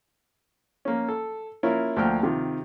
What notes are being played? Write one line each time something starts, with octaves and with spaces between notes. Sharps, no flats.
A#3 C#4
A4
A#3 C#4 E4 F4 A#4
D2 F3 A#3 G5 F6
C3 D#3 F4